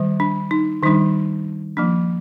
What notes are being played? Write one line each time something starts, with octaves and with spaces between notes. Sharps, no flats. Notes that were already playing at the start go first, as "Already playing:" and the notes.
Already playing: D#3 G3
D4
D#4
D#3 G3 D4 D#4
F3 A#3 D4